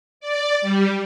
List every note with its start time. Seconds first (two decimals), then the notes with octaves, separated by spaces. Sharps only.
0.20 D5
0.62 G3